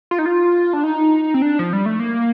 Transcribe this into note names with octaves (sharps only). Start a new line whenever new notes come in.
F4
D#4
F4
D4
D#4
C4
D4
F3
G3
A3
A#3